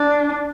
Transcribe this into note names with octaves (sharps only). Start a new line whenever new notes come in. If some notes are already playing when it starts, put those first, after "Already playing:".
Already playing: D4